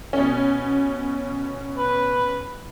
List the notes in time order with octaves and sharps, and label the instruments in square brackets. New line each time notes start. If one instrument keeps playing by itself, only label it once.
[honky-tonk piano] B2 C#4
[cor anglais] B4